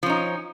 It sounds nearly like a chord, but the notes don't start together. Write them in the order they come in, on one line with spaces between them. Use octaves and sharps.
F3 C#4 D#4